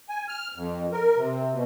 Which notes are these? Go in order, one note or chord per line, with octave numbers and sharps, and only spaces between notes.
G#5
F6
F2
A#4
C3
B2